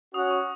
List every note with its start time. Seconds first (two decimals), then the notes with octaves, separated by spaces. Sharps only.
0.14 C#4 F#4 C#5 F#5 D#6
0.31 C#6